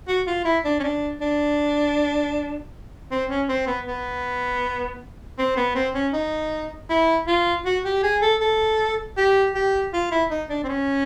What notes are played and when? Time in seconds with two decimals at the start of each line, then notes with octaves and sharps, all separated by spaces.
0.08 F#4
0.27 F4
0.45 E4
0.65 D4
0.80 C#4
0.83 D4
1.21 D4
3.11 C4
3.30 C#4
3.49 C4
3.67 B3
3.86 B3
5.39 C4
5.57 B3
5.75 C4
5.95 C#4
6.14 D#4
6.90 E4
7.27 F4
7.65 F#4
7.85 G4
8.03 G#4
8.22 A4
8.41 A4
9.17 G4
9.55 G4
9.93 F4
10.12 E4
10.31 D#4
10.49 D4
10.64 C4
10.69 C#4